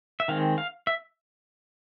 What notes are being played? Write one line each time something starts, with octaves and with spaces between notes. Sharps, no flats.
E5
D#3 G#3 C4 F5
F5
E5